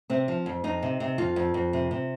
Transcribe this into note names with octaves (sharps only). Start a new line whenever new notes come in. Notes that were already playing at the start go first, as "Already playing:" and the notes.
C3 C4
F3
F2
F2 D#4
C3
C3
F2 F4
F2
F2
C3
C3